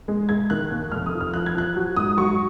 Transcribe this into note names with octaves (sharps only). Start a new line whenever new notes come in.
G#3
G#3 G#6
D#3 F#6
D#2
F1 F6
D#6
F3
F6
F3 F#6
G#6
F3 F#6
F#3
G#2 D#6
F#3 C#6